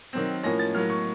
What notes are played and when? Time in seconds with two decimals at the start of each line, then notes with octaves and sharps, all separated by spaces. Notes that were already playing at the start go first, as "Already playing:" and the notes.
0.13 D#3 F#3 C4
0.44 A2 F3 A#3 C#4 A#6
0.59 A6
0.74 A2 F#3 A#3 F6
0.90 C#6